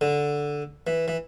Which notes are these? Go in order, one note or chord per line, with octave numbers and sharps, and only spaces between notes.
D3
E3
E3